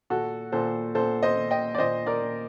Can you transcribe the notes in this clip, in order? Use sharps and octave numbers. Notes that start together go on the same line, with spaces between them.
A#2 F#4 A4
A#2 A4 C5
A#2 A4 C5
C5 D#5
A#2
D#5 G5
D5
A#2 C5 D#5
A#4 D5
A#2